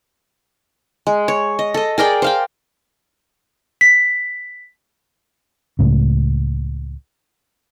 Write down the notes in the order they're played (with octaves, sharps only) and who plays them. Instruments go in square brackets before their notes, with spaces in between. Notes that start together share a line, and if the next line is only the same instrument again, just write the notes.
[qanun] G#3
C#5
D#5
A4 D#5
G#4 A#4 D5 G5
C5 F5 G5
[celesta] B6
[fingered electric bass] C#2 A2 C#3